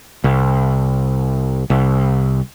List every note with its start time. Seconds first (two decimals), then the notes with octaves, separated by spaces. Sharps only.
0.24 C2
1.70 C2